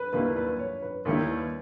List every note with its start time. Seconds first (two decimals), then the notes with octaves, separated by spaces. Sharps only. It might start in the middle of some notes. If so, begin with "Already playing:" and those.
Already playing: A#4 B4
0.13 D#2 D#3 G3 A#3 E4 B4
0.36 B4
0.59 C#5
0.82 B4
1.05 D#2 D#3 G3 A#3 E4 C#5
1.29 B4